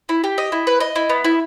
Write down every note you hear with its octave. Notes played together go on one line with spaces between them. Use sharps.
E4
G4
D#5
E4
B4
D#5
E4
B3
E4